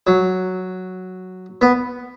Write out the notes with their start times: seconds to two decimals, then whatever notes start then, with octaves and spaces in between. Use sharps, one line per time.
0.07 F#3
1.61 B3